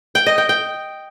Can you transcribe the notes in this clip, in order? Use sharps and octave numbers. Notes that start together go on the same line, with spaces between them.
G5
D#5
G5
G5